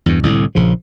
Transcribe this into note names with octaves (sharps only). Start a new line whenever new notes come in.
E2 G2
C2 A2 D3
A#1 C#3 F3